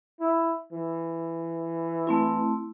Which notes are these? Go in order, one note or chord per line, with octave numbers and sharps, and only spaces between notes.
E4
E3
A3 C4 E4